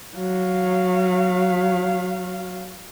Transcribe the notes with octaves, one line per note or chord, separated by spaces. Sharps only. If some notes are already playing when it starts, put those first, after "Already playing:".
F#3 F5